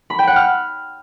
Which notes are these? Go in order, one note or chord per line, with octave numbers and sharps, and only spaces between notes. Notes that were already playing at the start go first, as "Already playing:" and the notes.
B5
G5
F#5
F6